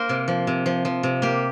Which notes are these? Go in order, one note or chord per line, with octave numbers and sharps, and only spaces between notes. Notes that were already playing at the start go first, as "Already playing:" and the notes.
Already playing: A#3 A#4 C5
C3
F3
C3
F3
F3
C3
A#3 G4